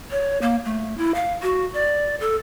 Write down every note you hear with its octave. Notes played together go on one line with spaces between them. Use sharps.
C#5
A#3
A3
E4
F5
F#4
D5
A4